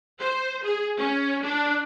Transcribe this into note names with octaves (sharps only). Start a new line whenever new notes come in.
C5
G#4
C#4
D4